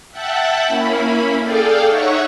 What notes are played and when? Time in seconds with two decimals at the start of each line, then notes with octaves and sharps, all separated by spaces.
0.11 E5 F#5 G5 A5 F#6
0.67 A#3 C#4 E4 B5
1.39 G#4 A4 D5 F5 G5
1.86 D#4 C#5 E5 F#5 C#6